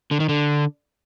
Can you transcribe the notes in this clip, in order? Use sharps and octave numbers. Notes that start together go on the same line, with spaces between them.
D3
D#3
D3